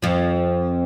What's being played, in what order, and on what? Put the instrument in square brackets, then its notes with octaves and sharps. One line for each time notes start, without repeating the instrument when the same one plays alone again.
[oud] F2 F3